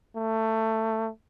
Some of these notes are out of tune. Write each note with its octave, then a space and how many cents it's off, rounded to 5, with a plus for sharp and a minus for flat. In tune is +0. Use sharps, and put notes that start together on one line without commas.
A3 +15